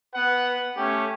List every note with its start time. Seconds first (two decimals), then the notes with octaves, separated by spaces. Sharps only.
0.14 B3 B4 F#5
0.75 A3 C#4 G4